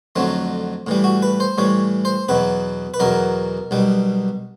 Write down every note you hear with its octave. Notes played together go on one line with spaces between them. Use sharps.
F2 D3 F#3 A3 C4
A2 E3 G3
F#4
B4
C5
A2 E3 G3 C#5
C5
E2 B2 F#3 B4
B4
E2 B2 F#3 A#4
B1 B2 G3